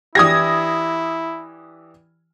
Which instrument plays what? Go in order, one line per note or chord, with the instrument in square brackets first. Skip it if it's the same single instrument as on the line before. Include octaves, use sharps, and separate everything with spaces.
[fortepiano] E3 D4 G4 [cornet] E4 [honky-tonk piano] D#6 G#6 A#6